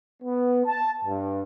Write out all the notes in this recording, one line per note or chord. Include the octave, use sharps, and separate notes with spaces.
B3
A5
G2